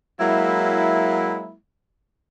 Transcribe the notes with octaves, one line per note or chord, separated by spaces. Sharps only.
F#3 G#3 A#3 E4